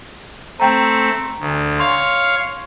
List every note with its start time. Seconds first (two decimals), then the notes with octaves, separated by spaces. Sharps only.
0.60 A3 C4 G5 A#5
1.40 D2
1.79 C#5 F5 C6